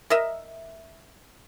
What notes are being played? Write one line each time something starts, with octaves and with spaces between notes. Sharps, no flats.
A#4 D#5 E5